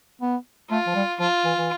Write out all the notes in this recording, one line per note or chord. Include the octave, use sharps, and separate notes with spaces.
B3
A3 F4
F3
G3
F3 F4
E3
E3